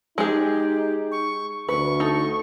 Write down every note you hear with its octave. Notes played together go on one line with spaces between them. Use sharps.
G#3 D#4 G4 G#4
C#6
D2 B4 C#6
D#4 A4